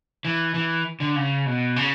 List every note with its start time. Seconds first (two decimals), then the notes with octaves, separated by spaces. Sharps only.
0.25 E3
0.54 E3
1.00 D3
1.16 C#3
1.46 B2
1.76 C#3